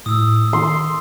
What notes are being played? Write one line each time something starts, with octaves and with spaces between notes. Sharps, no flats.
A2 D#6 E6
D#3 C6